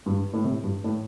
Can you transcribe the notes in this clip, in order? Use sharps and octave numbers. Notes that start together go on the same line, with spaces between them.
G2
A2
C3
G2
A2